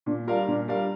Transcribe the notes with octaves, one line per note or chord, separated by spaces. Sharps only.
A#2 D4
G3 D4 F4 A#4 F5
A#2 D4
G3 D4 A#4 F5